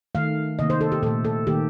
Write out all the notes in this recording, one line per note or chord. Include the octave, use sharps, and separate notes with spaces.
D#3 A3 F5
C3 D#3 A#3 D#5
C5
A4
G4
A#2 A3 A4
A4
D#3 A#3 G4